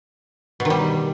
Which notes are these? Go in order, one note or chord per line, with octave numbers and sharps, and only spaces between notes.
B2
D#3
G3